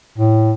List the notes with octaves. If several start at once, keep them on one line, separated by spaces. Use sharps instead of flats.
A2